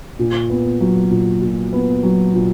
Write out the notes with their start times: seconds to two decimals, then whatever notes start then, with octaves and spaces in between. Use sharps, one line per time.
0.19 A#2
0.50 B3
0.81 F#3
1.11 A#2
1.42 A#2
1.73 B3
2.03 F#3
2.34 A#2